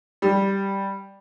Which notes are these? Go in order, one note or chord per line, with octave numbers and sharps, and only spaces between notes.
G3